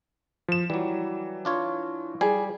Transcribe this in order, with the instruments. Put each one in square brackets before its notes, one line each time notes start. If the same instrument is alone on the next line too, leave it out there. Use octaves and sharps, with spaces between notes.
[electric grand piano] F3 E7
[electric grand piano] E3 [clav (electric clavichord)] F#3 G3
[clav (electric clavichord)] D4 F4 C#5
[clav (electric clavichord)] G3 [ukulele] G#4